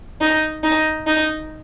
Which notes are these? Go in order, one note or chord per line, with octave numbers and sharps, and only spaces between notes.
D#4
D#4
D#4